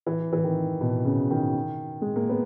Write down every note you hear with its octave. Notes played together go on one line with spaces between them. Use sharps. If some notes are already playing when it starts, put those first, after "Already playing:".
E3
E3
D#3
B2
C#3
D#3
G#3
A#3
B3